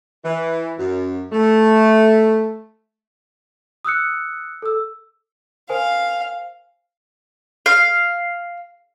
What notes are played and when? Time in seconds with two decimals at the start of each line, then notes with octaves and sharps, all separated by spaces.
0.25 E3
0.78 F#2
1.32 A3
3.85 D#6 E6 F#6 C#7
4.62 A4 E6
5.69 A#4 C5 F5 G#5
7.66 F5